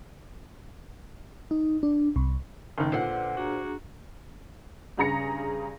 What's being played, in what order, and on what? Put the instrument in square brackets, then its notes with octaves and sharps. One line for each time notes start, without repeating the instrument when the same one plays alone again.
[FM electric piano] D#4
D4
C2
[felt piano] F#1 D#3 [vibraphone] D#4
[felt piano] A#2 [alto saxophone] D3 [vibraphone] B4 [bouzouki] C5 F#5
[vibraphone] D4 G#4 A#5 [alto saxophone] F#4
[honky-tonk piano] G2 C#3 G#4 A#5 A#6 C#7